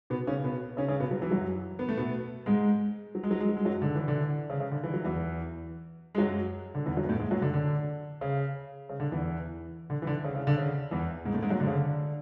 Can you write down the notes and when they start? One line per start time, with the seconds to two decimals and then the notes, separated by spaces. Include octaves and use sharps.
0.10 B2 B3
0.27 C#3 C#4
0.43 B2 B3
0.77 C#3 C#4
0.88 C#3 C#4
1.00 B2 B3
1.11 F#3
1.22 E3
1.31 F#2 F#3
1.79 B3
1.89 A3
1.97 B2 B3
2.46 G#2 G#3
3.15 F#3
3.23 G#3
3.31 F#3
3.40 G#3
3.49 F#3
3.57 G#3
3.65 F#2 F#3
3.82 D3
3.95 E3
4.08 D3
4.50 C#3
4.60 C#3
4.71 D3
4.84 E3
4.94 F#3
5.04 E2 E3
6.15 G#3
6.18 F#2 F#3
6.75 D3
6.86 E2 E3
6.97 F#2 F#3
7.04 B3
7.09 A2 A3
7.19 G#2 G#3
7.31 F#2 F#3
7.42 D3
7.54 D3
8.21 C#3
8.89 C#3
9.00 D3
9.12 E2 E3
9.90 D3
10.02 E3
10.07 D3
10.24 C#3
10.35 C#3
10.47 D3
10.58 C#3
10.91 E2 E3
11.26 G#2 G#3
11.34 A2 A3
11.43 G#2 G#3
11.51 F#2 F#3
11.60 D3
11.67 C#3
11.74 D3